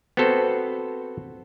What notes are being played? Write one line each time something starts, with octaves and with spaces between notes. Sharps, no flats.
B3 C4 F#4 A4 C5